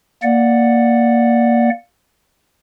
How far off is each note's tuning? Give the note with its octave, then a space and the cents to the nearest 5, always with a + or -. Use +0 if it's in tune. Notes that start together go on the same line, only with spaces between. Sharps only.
A#3 +0 D5 +0 F#5 -5